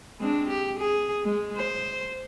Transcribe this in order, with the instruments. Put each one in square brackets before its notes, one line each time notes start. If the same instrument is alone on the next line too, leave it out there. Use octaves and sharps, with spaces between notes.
[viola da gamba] G#3 C4 D4
G4
G#4
G#3
C5